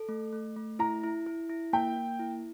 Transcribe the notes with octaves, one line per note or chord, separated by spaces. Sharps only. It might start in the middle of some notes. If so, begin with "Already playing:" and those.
Already playing: A4
A3
A3
A3
E4 A#5
E4
E4
E4
A#3 G5
A#3
E4